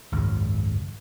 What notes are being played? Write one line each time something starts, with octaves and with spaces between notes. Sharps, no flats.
G#1 C#2 F#2